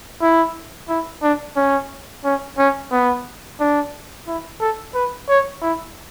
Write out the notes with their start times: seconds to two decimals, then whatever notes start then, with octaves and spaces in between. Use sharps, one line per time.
0.22 E4
0.89 E4
1.23 D4
1.56 C#4
2.25 C#4
2.58 C#4
2.92 B3
3.60 D4
4.27 E4
4.61 A4
4.95 B4
5.29 C#5
5.62 E4